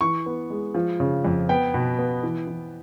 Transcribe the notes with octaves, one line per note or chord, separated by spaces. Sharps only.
E3 C#6
B3
G#3
F3
C#3
F2
B3 G5
B2
B3
E3
E3